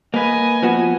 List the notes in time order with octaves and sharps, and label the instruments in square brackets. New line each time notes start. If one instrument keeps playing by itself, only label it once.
[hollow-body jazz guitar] A#3 B4 [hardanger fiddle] D#5 G#5
[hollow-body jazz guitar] F3 B3 F#4